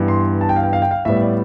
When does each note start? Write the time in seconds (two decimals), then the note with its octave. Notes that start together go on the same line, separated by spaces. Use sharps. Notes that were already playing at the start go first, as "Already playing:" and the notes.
Already playing: G2 E3 B3
0.08 C6
0.41 A5
0.49 G5
0.56 F5
0.63 G5
0.73 F5
0.82 G5
0.91 F5
1.05 A2 G3 B3 E5
1.22 D5